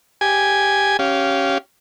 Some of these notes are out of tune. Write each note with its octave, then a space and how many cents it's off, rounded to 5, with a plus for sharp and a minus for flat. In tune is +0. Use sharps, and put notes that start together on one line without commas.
G4 +0 G#5 +0
C#4 +0 G4 -25 F5 -10